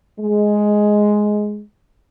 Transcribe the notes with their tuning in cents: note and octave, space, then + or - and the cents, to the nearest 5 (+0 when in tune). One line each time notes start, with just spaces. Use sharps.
G#3 +5